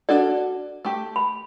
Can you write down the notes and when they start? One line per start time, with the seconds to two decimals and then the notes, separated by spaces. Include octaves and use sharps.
0.09 D4 F#4 A4 D5
0.85 A3 G4
1.16 B5